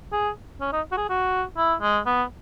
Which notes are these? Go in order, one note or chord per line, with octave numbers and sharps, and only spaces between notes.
G#4
C#4
D#4
F#4
G#4
F#4
E4
G#3
B3